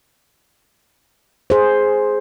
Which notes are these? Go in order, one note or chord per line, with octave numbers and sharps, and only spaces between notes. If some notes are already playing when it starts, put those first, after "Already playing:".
G#4 C5